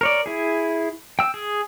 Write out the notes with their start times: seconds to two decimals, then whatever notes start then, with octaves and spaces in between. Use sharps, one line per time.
0.01 A#4 C#5 D5
0.26 E4 G#4
1.19 G5 E6
1.34 G#4